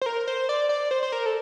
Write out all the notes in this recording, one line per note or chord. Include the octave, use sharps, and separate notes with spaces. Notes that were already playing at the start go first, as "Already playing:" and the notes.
C5
A#4
C5
D5
D5
C5
C5
A#4
A4